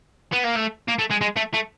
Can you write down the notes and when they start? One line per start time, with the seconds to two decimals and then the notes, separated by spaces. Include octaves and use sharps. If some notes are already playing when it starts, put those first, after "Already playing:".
0.33 B3
0.45 A#3
0.56 A3
0.88 A#3
0.99 A3
1.11 G#3
1.21 G#3
1.36 A3
1.54 A3